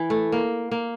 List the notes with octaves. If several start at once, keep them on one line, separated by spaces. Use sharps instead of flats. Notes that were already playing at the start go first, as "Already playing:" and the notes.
Already playing: E3
A3
A#3
A#3